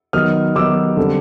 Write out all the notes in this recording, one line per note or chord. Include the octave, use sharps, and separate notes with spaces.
D#3 F#3 B3 D#4 D#6 F6
D#3 F#3 B3 D#4 D6 E6
D3 G3 C4